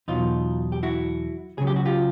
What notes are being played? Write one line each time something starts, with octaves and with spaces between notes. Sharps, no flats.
E2 B2 F#3 D#4 F4
G4
E4 F#4
C#2 C#3 F#3 G#4
G4
F#4
F4 G4